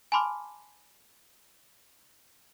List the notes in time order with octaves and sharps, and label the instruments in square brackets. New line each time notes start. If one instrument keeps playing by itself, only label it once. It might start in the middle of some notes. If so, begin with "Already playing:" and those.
[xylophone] G#5 A5 B5 C6 D6 F6